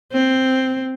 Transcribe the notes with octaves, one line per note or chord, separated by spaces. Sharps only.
C4